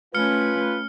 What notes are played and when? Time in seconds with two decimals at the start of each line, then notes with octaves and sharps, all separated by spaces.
0.14 A3 C#4 F4 B4 F6 C#7